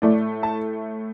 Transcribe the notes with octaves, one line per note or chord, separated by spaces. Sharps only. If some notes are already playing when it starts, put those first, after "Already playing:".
A2 A3 D5
A5